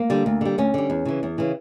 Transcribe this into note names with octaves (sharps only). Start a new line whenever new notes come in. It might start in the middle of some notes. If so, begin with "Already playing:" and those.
Already playing: A#3
D3 G3
D2
D3 G3
D2 C#4
D3 G3
E2
C#3 E3
E2
C#3 E3